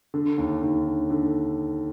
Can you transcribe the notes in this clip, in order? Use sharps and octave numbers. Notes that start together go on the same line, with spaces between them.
D3
D#2
D#2
D3
D3